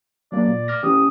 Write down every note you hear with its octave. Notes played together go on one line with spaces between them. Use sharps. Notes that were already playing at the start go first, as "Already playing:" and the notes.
F#3 A#3 D5
A#2
D6 F6 A#6
E3 C#4 G4 D#6